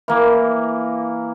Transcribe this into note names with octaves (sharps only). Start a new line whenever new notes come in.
E3 A#3